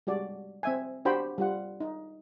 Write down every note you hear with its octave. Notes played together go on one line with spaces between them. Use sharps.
G3 G#3 F#4 D5
C4 E5 G#5
D4 F#4 G4 C5 G5 B5
G3 F4 F#5
D#4